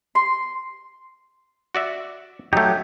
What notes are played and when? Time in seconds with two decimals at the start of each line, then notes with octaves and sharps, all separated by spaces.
0.15 C6
1.75 F#4 D5 E5
2.53 F#3 A3 D#4 G4